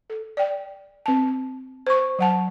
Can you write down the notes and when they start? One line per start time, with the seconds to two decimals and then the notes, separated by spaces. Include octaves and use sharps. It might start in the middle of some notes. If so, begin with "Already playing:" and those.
0.10 A4
0.37 D5 G5
1.06 C4 A5
1.87 C5 C#6
2.19 F#3 F#5 A5